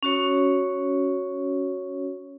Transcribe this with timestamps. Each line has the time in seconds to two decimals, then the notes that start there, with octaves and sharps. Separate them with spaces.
0.03 C#4 F#4 C#5